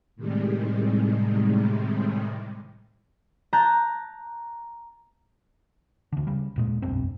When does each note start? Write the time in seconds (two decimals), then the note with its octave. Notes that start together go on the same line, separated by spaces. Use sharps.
0.16 A2 C3 D#3 G3 G#3
3.53 A5 A#5 F#6 G6
6.12 D2 D3
6.27 C#3 G3
6.56 D#1 A#2 G#3
6.82 F1 B1 G2 C4